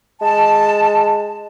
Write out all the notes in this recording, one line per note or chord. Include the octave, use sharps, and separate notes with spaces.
G#3 A5